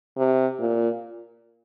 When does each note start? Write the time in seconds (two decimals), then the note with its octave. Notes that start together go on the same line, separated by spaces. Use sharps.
0.17 C3
0.59 A#2